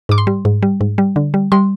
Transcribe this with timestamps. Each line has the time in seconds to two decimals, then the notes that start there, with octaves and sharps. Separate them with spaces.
0.09 G#2 D6
0.18 C6
0.27 G3
0.45 G#2
0.63 G3
0.81 G#2
0.98 G3
1.16 D3
1.34 G3
1.52 G3 C6